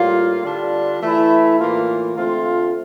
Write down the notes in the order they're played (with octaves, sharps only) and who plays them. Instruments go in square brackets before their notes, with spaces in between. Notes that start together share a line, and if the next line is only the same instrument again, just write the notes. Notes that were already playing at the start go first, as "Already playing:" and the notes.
Already playing: [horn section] A2 G3 A#3 F4
D3 G3 D4 F4
E3 A3 E4
A2 E3 A#3 F4
D3 A3 C4 F4